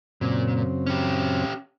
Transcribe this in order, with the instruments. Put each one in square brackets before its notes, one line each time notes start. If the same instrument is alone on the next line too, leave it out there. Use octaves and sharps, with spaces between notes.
[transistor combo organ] F#2 C#3 C4 [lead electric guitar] A#2
[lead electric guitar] C#4 G4